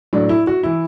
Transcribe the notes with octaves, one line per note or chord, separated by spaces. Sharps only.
A2 F#3 D4
E4
F#4
E3 E4